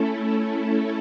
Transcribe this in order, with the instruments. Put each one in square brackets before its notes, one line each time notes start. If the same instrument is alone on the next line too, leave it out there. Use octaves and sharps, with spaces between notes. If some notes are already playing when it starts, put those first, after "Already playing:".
Already playing: [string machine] A3 C#4 E4 A4